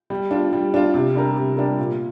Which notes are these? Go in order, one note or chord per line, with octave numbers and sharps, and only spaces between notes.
G3
D4 F4
G3
D4 F4
C3
G3 D4 A#4
C3
G3 D4 A#4
A#2